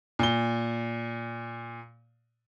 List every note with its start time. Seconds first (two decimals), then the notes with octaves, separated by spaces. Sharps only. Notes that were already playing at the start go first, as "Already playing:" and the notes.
0.19 A#2 G7